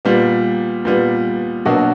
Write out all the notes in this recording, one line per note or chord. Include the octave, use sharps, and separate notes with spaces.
A#2 G3 B3
A#2 G3 B3
B2 F#3 A#3 D4 F#4